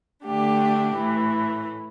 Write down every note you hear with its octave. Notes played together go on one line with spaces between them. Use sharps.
D3 A3 D4 G4
A2 E3 A3